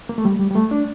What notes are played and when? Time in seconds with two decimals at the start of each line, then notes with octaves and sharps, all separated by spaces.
0.09 A#3
0.18 A3
0.25 G3
0.39 G3
0.50 G3
0.55 A3
0.71 D4